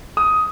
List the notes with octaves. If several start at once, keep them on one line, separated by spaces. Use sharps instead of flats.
D#6